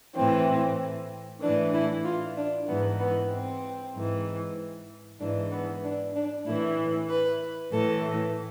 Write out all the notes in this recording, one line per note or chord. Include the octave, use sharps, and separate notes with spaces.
A2 E3 C4
A2 E3 D4
E4
F4
D4
G#2 E3 B3
B3
C4
G#2 E3
G#2 E3 D4
B3
D4
D4
A2 E3 E4
B4
A2 E3 A4